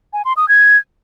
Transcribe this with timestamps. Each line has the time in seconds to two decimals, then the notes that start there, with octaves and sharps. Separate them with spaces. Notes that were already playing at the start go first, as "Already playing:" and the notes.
0.13 G#5
0.25 C6
0.37 D#6
0.48 G#6